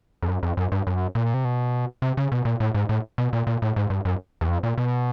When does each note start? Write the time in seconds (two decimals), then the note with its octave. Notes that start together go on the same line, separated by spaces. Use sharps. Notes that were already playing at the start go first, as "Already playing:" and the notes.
0.23 F2
0.28 F#2
0.43 F2
0.57 F#2
0.72 G2
0.87 F#2
1.15 A#2
1.34 C3
1.45 B2
2.02 C3
2.17 C#3
2.32 B2
2.45 A#2
2.60 A2
2.75 G#2
2.89 A2
3.18 B2
3.33 A#2
3.47 A#2
3.62 A2
3.76 G#2
3.90 G2
4.05 F#2
4.41 E2
4.48 F2
4.63 A#2
4.78 B2